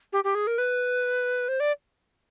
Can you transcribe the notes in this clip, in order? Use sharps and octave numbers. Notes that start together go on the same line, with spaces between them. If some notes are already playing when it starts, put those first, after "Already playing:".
G4
G4
G#4
A#4
B4
C5
D5